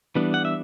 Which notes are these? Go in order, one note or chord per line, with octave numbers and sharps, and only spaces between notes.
E3 G3 B3 D4
F#5
E5